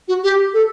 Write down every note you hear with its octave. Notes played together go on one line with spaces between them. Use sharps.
F#4
G4
A4